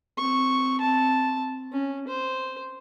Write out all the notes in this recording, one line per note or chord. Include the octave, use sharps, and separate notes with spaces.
C4 C#6
C4 A5
C#4
C5